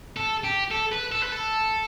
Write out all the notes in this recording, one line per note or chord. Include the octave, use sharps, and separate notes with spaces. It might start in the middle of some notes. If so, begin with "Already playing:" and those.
A4
G4
A4
B4
A4
B4
A4